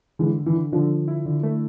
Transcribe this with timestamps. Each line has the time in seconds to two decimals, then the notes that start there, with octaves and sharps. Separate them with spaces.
0.19 D3 E3 G#3
0.37 D3
0.46 E3
0.55 D3
0.73 D3 F3
0.90 D3
1.08 E4
1.26 D3
1.43 A3